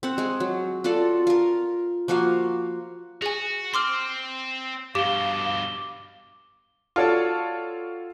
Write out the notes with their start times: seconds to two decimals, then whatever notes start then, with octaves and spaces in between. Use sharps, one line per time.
0.03 C4 F#5
0.18 G#3 G#4
0.40 F#3
0.84 F4 F#4 A4 D5
1.27 F4 A#4
2.08 F3 A#3 F#4 F5
3.22 F#4 G#4 G#5
3.74 C4 C6 D6 F6
4.95 G2 B2 G4 F5 D6 G7
6.96 F4 F#4 A4 C#5 D5 A5